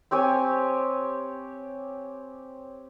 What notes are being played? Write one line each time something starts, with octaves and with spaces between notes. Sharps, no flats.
C4 G4 C#5 G#5